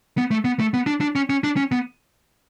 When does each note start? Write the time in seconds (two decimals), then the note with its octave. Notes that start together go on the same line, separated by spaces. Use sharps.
0.17 B3
0.31 A3
0.45 B3
0.60 A3
0.74 B3
0.86 D4
1.01 D4
1.15 C#4
1.30 C#4
1.44 D4
1.56 C#4
1.72 B3